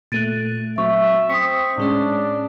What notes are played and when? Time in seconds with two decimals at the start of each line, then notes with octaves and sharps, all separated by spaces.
0.12 A#2 A3 F#6 A6 D7 D#7
0.78 F#3 C4 E5 C#6
1.30 C4 C#6 D#6 B6
1.78 A2 G#3 C#4 D4